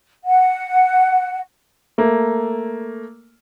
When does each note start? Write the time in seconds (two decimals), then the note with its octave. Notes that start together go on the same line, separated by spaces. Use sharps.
0.24 F#5
1.98 A3 A#3